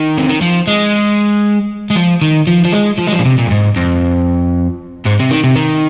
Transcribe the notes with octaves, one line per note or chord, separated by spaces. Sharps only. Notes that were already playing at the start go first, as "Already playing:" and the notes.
Already playing: D#3
C3
D#3
F3
G#3
G#3
F3
D#3
F3
F3
G#3
F3
G#3
F3
A#2
C3
A#2
F2
G#2
F2
G#2
C3
D#3
C3
D#3